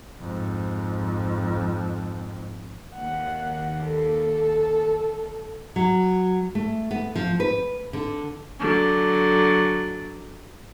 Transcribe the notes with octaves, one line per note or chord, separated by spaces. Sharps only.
F2 G#2
D#2 F#5
A4
F#3
A3
B3
F3
B4
D3
D3 F#3